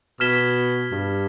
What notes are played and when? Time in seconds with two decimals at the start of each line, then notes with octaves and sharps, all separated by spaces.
0.20 B2 F6 G#6 B6 E7 G7
0.92 G2